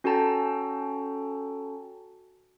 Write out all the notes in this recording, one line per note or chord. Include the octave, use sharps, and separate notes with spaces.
C#4 F#4 A4 G5 A5 A#5